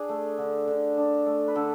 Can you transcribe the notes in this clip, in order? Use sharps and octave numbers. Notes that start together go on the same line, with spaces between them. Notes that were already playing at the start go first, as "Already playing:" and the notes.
Already playing: D4 G#4
A3
D3
D3
D4
A3
B4
D3 A4